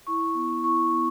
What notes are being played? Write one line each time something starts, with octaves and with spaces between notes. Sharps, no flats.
E4 C#6
B3
E4 C#6
B3